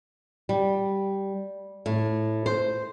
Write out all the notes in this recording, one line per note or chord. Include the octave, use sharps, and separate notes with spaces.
G3
A2
C5